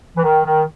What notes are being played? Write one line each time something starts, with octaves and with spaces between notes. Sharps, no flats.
E3
D#3
D#3